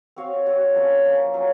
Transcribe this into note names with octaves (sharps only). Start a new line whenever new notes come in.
C4 F#4 C#5 F5
C4 F#4 C#5 F5
F3 A#3 C#4
F3 A#3 C#4
F#3 C#4 F4 C5